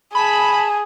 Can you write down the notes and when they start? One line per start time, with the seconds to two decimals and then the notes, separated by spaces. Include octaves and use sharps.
0.15 G#4 A5 B5